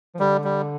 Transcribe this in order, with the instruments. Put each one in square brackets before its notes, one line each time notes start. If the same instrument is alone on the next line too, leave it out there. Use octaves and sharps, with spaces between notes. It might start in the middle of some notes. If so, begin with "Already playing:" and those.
[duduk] F3
[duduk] D3 [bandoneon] G3
[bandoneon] G3